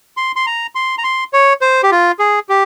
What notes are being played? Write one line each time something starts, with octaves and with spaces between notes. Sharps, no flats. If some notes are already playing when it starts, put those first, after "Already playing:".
C6
C6
A#5
C6
A#5
C6
C#5
C5
G4
F4
G#4
G4